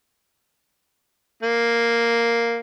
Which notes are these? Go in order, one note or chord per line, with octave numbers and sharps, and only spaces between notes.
A#3